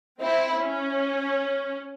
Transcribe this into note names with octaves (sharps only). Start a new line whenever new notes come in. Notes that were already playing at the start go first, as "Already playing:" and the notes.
C4 E4
C#4